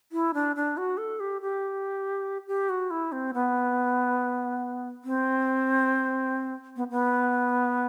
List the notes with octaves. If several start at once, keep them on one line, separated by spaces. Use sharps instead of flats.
E4
D4
D4
F#4
A4
G4
G4
G4
F#4
E4
C4
B3
C4
B3
B3